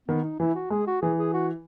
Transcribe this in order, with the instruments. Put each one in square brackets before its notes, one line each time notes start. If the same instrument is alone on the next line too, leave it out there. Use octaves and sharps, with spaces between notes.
[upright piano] D#3 [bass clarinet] B3
[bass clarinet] D#4
[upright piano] E3 [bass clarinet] E4
[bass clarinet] F#4
[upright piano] G#3 [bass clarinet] G#4
[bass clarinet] F#4
[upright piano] E3 [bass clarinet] G#4
[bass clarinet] G#4
F#4